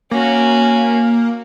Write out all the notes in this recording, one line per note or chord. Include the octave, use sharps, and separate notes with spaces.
A#3 C#4 F#4